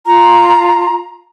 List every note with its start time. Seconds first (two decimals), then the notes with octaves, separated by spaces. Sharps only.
0.06 F4 A#5